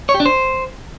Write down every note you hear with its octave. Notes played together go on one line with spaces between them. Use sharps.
C#5
G4
D4
C5